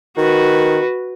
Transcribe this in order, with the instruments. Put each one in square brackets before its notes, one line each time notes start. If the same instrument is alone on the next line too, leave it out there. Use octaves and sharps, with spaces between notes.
[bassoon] D#3 [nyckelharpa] F#4 B4